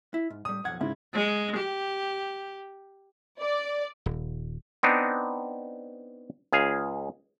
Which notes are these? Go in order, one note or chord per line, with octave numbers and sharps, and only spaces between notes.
E4
G#2
A2 G3 D#6
B1 F2 F#5 G#6
G#2 C#3 E4
G#3
G4
D5
D#1
B3 C4 D4 D#4
C#2 G#4 F5